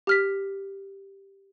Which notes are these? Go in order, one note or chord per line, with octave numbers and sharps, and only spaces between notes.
G4 F6 B6